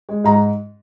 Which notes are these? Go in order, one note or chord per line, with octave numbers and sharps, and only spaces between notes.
G#3
G#2 A#5